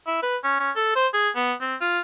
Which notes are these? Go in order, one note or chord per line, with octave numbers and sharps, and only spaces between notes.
E4
B4
C#4
C#4
A4
C5
G#4
B3
C4
F4